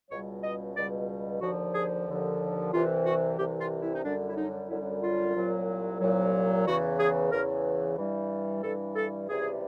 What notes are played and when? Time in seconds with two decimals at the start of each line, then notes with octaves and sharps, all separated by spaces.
0.10 C#2 B2 G3 C#5
0.43 D#5
0.76 C#2 B2 G3 D5
1.41 D#2 D3 F3 F#4
1.74 G#4
2.07 D#2 D3 F3
2.72 C2 C3 E3 F4
3.05 F#4
3.38 C2 C3 E3 G4
3.60 F4
3.82 E4
3.94 D#4
4.04 F#2 D3 G3 D4
4.29 E4
4.37 D#4
4.69 F#2 D3 G3 E4
5.02 F4
5.35 C2 A#2 F#3
6.00 C2 A#2 F#3
6.66 E2 C#3 E3 F#4
6.99 G#4
7.32 E2 C#3 E3 A#4
7.97 G2 E3 G3
8.63 G2 E3 G3 A4
8.96 A4
9.29 C#2 C3 E3 G3 G#4